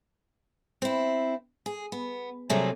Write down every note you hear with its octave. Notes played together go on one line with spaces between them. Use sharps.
C4 E4
G#4
B3
C3 F#3 G3 A3 A#3 G#4